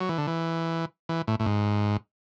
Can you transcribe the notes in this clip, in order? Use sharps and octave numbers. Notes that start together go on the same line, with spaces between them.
F#3
E3
D3
E3
E3
A2
A2
G#2